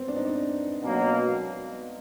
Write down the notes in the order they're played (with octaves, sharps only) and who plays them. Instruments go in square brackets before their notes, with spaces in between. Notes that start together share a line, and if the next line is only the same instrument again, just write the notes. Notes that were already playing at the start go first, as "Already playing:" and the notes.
Already playing: [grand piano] B3 C4
D4
D#4
D4
[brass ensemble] B2 F#3 A#3